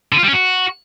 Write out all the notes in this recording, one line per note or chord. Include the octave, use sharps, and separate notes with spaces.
D3
F4
G3
C#4
F#4